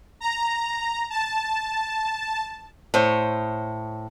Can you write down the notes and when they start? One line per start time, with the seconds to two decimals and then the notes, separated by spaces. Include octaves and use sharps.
0.20 A#5
1.10 A5
2.94 A2 C5 C#5